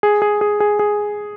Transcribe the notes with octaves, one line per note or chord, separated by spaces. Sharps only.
G#4
G#4
G#4
G#4
G#4